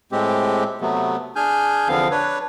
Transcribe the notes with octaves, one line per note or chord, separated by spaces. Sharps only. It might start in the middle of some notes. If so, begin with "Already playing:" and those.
A2 G#3 C4 G4
C3 F#3 A3 B3
D4 G#4 G#5 F6 G6
E2 D3 F3 B3 C4 F5
D4 B4 C#5